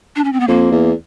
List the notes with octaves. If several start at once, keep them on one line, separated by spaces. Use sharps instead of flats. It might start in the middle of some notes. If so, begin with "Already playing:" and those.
D4
C#4
C4
B3
F2 A#3
E2